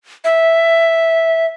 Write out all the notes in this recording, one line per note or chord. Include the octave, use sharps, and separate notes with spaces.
E5